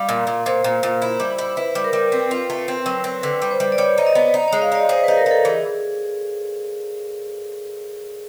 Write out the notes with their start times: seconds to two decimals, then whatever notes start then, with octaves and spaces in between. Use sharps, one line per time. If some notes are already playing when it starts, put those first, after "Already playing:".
Already playing: G3 F5
0.09 A#2
0.27 A#2
0.46 A#2 C5
0.64 A#2
0.83 A#2
1.02 E4
1.20 G3
1.38 E4
1.57 E4 B4
1.75 G3
1.84 A#4
1.93 G3
2.12 C4 B4
2.31 F4
2.50 A3
2.68 C4
2.86 F#3
3.04 C4
3.23 D3 B4
3.42 G3 B4
3.51 C5
3.60 G3
3.72 D5
3.78 G3 C#5
3.98 D#4
4.07 D#5
4.15 B3
4.34 D#4
4.48 G#3 C#5
4.62 F5
4.72 D#4 D5
4.89 G#4 C5
5.04 D#4 B4
5.17 A#4
5.26 D#4 A4
5.45 E3 G#4